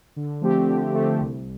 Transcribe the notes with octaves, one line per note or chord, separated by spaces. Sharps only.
D3
F3 A3 C4 G4
D3
F3 A3 C4 G4
C2